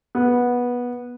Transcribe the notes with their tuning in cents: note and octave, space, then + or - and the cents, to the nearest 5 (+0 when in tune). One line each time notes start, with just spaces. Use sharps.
B3 -15